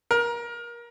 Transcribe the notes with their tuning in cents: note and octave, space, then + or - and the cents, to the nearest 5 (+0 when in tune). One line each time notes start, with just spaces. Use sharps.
A#4 +25